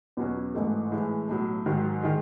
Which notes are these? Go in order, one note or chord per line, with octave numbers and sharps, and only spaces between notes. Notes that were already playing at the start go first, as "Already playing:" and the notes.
E2 B2 F#3 C#4 F#4
A1 G#2 E3 A3
A2 E3 G#3
B1 A2 F#3
G#2 D#3 F#3
D#3 G#3